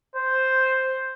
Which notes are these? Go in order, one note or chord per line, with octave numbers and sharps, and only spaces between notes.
C5